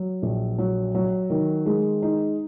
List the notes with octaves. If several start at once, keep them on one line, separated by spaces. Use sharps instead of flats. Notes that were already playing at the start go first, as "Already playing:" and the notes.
Already playing: F#3
A#1
F#3
F#3
D#3
G#3
D#4